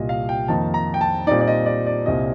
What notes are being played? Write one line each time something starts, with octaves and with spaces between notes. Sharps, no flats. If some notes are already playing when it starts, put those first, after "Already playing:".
Already playing: C2 A#2 G3 D#5
F5
G5
F2 D#3 A#3 D#4 A5
A#5
G5
A5
A#2 G3 C4 D#4 D5
D5
D#5
D5
D5
C2 A#2 G3 C4 D#5